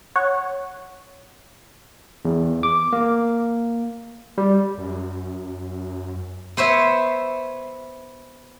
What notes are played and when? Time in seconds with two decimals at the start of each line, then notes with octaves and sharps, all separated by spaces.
0.16 C#5 F#5
2.25 E2
2.63 D6
2.93 A#3
4.38 G3
4.78 F#2
6.57 B3 C5 C#5 E5